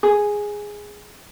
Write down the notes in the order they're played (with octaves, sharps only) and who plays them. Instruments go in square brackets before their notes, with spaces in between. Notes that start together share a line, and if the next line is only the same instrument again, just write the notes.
[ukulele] G#4